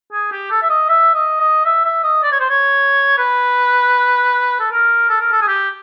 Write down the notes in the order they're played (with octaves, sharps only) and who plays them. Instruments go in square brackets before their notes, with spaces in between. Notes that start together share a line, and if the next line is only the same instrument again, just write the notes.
[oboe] G#4
G4
A4
E5
D#5
E5
D#5
D#5
E5
E5
D#5
D5
C#5
C5
C#5
B4
A4
A#4
A4
A#4
A4
G#4
G4